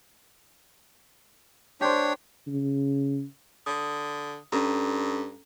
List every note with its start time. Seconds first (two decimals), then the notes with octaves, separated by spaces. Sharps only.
1.81 D4 G4 C5 C#5
2.47 C#3
3.66 D3 D#6
4.52 G2 C#4 A4 A#5